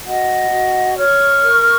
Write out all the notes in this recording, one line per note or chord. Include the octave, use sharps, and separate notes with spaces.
F#4 D#5 F#5
F#4
C#5 C#6 F6
A#4